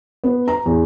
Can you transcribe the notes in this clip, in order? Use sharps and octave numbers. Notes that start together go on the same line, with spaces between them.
B3
A#5
E2